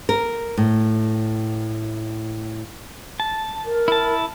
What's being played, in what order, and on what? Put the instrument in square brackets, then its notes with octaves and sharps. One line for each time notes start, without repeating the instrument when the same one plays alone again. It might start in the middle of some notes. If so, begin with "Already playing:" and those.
[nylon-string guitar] A#4
A2
[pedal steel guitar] A5
[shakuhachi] A#4
[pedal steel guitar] E4 A5